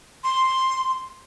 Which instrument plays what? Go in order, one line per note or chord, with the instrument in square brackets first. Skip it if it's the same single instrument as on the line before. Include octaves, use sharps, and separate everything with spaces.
[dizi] C6